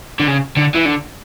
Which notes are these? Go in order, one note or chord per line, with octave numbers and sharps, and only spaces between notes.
D3
C#3
D3
E3
D3